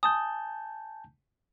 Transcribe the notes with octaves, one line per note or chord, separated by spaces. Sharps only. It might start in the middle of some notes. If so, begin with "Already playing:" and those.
G#5 A5 D#6 G6